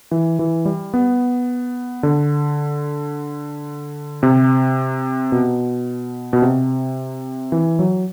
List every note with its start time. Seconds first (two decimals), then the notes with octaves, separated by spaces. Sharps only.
0.11 E3
0.39 E3
0.65 G3
0.94 B3
2.03 D3
4.23 C3
5.32 B2
6.33 B2
6.42 C3
7.52 E3
7.79 F#3